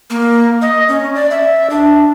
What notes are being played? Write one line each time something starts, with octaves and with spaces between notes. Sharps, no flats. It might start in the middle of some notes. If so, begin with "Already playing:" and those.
A#3
D#5
C#4
D5
E5
D4